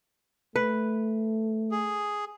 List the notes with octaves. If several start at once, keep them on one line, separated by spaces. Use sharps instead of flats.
A3 B4
G#4